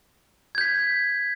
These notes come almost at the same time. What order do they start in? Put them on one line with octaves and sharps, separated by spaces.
G#6 G6 B6